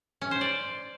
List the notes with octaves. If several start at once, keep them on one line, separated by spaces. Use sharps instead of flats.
C#4
C5
D5